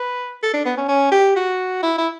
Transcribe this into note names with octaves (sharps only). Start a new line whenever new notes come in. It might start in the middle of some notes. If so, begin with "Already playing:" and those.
Already playing: B4
A4
D4
B3
C#4
C#4
G4
F#4
E4
E4